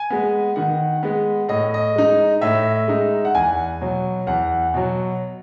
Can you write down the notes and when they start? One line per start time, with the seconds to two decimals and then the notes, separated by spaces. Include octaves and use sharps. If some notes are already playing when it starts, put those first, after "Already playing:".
Already playing: G#5
0.10 G#3 B3
0.56 D#3 F#5
1.03 G#3 B3
1.49 A2 D#5
1.74 D#5
1.96 G#3 D#4
2.41 A2 E5
2.88 G#3 D#4
3.25 F#5
3.34 E2 G#5
3.81 B2 F#3
4.27 E2 F#5
4.74 B2 F#3